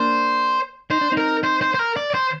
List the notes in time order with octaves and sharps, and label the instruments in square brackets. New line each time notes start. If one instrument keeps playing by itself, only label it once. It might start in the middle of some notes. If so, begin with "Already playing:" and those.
Already playing: [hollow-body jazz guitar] A#3 D4 [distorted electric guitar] C5
[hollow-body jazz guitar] D#4 [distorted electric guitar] C5
[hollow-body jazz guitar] D4
C4 D#4
[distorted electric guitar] A#4
C5
C5
C5
A#4
D5
C5